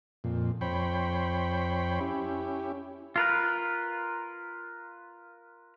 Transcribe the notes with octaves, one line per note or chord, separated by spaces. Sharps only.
F2 A#2
F2 C5 C#5 G5 B5
C#4 E4 G4
F4 A#4 B4